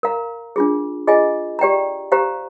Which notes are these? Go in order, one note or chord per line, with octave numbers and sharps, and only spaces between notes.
A#4 F5 A#5
D4 F4 G#4
F4 G#4 D#5 G#5
G4 D5 G5 A#5
G4 C5 F5 A#5